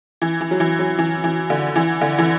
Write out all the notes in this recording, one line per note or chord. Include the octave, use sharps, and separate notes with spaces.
E3
E3
F#3
E3
F#3
E3
E3
D3
E3
D3
E3